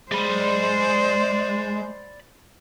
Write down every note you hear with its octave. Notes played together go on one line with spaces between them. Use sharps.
G#3 C5 D5 B5